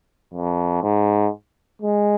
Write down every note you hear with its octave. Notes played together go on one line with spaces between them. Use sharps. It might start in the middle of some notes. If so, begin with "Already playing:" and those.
F2
G#2
G#3